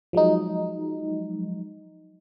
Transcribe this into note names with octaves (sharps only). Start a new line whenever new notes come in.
F3 F#3 G#3 D#4